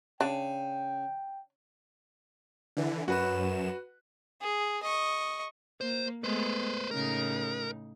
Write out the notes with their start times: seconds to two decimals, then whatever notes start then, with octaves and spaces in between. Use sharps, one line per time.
0.21 C#3 D4 G5
2.77 D3 E3
3.08 F#2 F#4 B4 E7
4.41 G#4
4.83 D#5 C#6
5.81 A#3 C5
6.24 G#3 A3 B3 B4 C5
6.91 A2 C#3 D#4 A#4